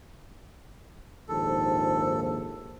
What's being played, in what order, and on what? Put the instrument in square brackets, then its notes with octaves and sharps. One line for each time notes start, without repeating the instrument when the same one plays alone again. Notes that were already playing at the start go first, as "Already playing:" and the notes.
[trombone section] A#1 D#2 G#2 [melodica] A4